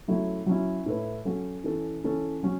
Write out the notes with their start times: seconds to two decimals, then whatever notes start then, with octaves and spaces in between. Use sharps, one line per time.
0.08 C#3 F#3 A3 E4
0.46 F#3 C#4 E4
0.86 A2 A3 E4 B4
1.25 F#3 C#4 F#4 A4
1.64 E3 C#4 A4
2.04 C#3 E3 C#4 A4
2.43 F#3 C#4